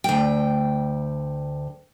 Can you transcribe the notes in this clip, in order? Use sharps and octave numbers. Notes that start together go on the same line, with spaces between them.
D2 G5